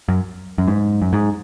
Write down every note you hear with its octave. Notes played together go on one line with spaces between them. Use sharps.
F#2
F#2
G#2
F#2
G#2